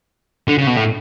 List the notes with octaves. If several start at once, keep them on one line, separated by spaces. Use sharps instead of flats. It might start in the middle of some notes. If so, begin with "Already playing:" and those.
D3
C#3
B2
A2